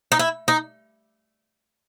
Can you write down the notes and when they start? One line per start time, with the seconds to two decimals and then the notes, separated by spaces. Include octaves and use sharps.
0.12 D#4
0.19 E4
0.48 D#4